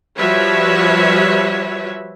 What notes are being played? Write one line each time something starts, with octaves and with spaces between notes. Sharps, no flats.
F3 G3 F#4 B4 C#5 E5